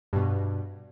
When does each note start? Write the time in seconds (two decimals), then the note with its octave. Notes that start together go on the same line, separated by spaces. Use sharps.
0.13 G2 B2